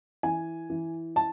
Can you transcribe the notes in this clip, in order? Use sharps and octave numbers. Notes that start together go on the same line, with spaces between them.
E3 G#5
E3
A5